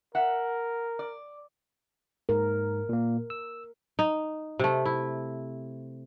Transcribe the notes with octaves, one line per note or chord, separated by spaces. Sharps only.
A#4 E5 F#5
D5
G#2 A#4
A#2 A#3
E6
D#4
C3 A3
E4